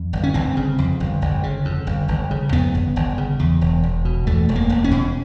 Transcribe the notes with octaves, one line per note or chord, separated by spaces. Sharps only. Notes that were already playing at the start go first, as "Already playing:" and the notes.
Already playing: F2
G1
C#4
G1 C4
C#3
F2
G1
G1
C#3
F2
G1
G1
C#3
F2 B3
G1
G1
C#3
E2
E1
E1
B2
E2 A3
E1
A#3
E1
C#4
B2